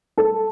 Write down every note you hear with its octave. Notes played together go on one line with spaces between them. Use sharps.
A4